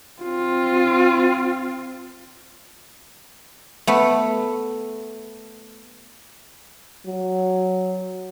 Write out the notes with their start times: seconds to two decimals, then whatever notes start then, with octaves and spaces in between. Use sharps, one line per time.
0.23 C4 F4
3.87 A3 B3
7.06 F#3